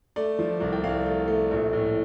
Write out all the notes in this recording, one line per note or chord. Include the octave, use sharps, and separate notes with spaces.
A3 D5
F3
C2
G5
C2 F5
A3
A3
A#1
A2